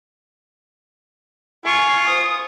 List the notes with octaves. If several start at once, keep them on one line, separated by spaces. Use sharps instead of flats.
F4 G#5 C#6
C5 D#6